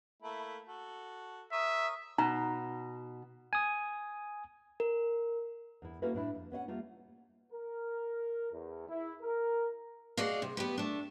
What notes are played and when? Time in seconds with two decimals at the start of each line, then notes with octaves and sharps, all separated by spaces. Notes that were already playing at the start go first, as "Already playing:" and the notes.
0.22 A3 A#3 E4
0.68 F#4 A4
1.52 A#4 C#5 E5 D#6
2.18 B2 D#4 A#5
3.53 G#5 D#6
4.80 A#4
5.82 E2 E4
6.02 A#3 C#4 E4 F#4 A4 B4
6.14 A2 D4 E4
6.34 F2
6.52 B3 C#4 E5 F#5
6.68 G3 A3 A#3 F4
7.53 A#4
8.51 E2
8.89 E4
9.21 A#4
10.17 F#4 G#4 D5 D#5 F5
10.42 C3
10.57 B3 G4 B4
10.78 A3 D4